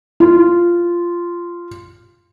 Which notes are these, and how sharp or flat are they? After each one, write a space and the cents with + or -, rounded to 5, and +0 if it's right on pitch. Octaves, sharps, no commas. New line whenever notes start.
F4 -10